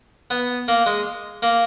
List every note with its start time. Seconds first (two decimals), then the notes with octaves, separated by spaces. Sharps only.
0.31 B3
0.68 A#3
0.86 G#3
1.43 A#3